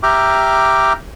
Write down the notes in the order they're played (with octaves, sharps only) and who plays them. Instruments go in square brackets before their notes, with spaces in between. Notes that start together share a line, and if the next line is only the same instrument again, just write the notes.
[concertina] G4 E5 G5 A#5 D6 F6